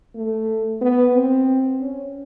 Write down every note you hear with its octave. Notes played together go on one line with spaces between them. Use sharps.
A3
B3
C4
C#4